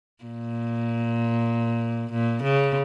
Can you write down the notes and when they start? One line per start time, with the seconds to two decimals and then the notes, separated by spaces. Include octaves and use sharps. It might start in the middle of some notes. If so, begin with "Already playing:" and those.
0.24 A#2
2.12 A#2
2.43 C#3